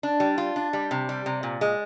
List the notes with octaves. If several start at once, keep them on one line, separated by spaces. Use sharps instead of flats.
D4
G3
F4
D4
G3
C3
G3
C3
A#2
G#3